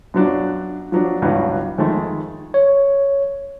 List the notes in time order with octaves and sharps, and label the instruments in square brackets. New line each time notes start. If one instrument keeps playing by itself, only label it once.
[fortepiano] F#2 B2 F#3 D4 F4
F3 F#3 D4
C#2 G2 B2 E3 F#3
F2 D#3 G#3 A3
[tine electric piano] C#5